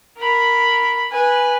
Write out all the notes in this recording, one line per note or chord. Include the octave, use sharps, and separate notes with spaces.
A#4 B5
B4 G#5